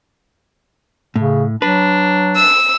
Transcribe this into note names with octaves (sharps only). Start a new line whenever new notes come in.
A2 C#3
F#3 D4 B4
E6